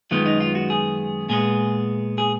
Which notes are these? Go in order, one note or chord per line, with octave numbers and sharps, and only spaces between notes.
F#2 D#3 G#3 B3 F4
D#4
F4
F#4
G#4
A#2 G#3 B3 G#4
G#4